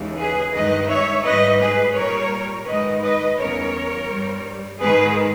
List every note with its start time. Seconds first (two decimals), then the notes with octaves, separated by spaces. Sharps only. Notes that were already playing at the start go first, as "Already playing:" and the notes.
Already playing: D#2 C#3 E3 G#3
0.18 G#4 B4
0.53 G2 D#3 G#3 B4 D#5
0.89 C#5 E5
1.24 G#2 G3 B4 D#5
1.60 G#4 B4
1.96 A#2 G3 A#4 C#5
2.67 G#2 D#3 G#3 B4 D#5
3.02 B4 D#5
3.38 E2 C#3 G3 A#4 C#5
4.09 G2 G3
4.81 G#2 D#3 G#3 G#4 B4